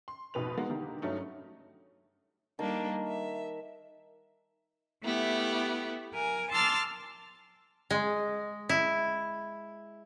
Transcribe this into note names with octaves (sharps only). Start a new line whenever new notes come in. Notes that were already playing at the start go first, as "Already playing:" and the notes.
C6
F1 G#2 B2 B4 F7
G#3 A#3 B3 D#4 F#4
D3 D#3 A#3 D#4 G4
G2 F#3 A3 C#4 D#4
D#3 G3 A#3 D4 A5
E5
A3 B3 E4 G4
A#4 G#5
A5 C6 D6 E6 F6 A6
G#3
E4